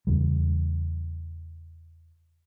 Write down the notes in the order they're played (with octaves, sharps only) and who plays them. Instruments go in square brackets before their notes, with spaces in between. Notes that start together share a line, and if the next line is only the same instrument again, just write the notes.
[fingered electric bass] E2 C#3 G3